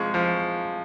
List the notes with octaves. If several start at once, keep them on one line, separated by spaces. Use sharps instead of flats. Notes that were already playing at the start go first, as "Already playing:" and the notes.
Already playing: C3 F3 G#3 C#6
F3